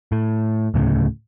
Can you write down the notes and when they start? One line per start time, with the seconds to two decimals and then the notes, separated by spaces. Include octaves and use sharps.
0.12 A2
0.74 D2 A2 C#3